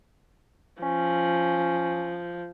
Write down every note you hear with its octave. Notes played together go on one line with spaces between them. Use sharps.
F3 C#4